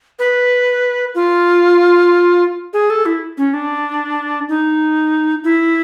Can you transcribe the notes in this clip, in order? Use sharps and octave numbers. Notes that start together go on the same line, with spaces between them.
B4
F4
G#4
A4
E4
C#4
D4
D#4
E4